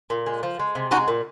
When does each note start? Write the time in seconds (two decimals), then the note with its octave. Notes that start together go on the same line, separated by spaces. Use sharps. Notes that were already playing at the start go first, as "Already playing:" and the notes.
0.10 A#2
0.26 G#3
0.43 F3
0.59 G#3
0.75 C3
0.91 G#3 D#4 F#4
1.08 A#2